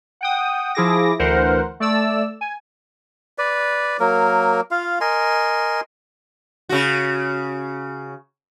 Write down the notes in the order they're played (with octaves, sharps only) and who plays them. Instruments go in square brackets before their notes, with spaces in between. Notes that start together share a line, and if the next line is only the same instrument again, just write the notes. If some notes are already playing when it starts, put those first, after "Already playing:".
[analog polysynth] F#5 G5 D#6
F3 E4 G#4 D6 A#6
D2 E3 A#4 C5 F#5
A3 D5 E6
G#5
[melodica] B4 D5
F#3 A#3 A#4
F4 F5
A#4 D#5 G#5 C6
[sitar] C#3 F#4